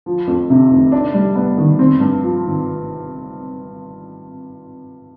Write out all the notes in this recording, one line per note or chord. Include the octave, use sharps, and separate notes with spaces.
F3
F2
C3
F1
D4
G3
B3
D#3
C4
G2
F3
G#1